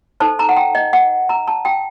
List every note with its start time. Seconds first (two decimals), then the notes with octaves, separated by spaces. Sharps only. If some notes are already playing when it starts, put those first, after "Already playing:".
0.20 D#4 A4 C5 A5
0.39 A#5
0.49 F#5
0.56 G5
0.75 D#5
0.93 F#5
1.29 A#5
1.48 A5
1.65 G5